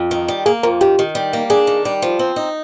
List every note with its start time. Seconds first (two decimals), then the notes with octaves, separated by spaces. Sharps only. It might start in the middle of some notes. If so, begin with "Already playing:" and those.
Already playing: F2
0.11 D#3
0.28 G3
0.46 A#3 G#4
0.63 F2 A#4
0.81 D#3 G4
0.99 D#3
1.15 G3
1.33 A#3
1.50 D4 G#4
1.67 D#3
1.85 G3
2.02 F3
2.19 C4
2.36 D#4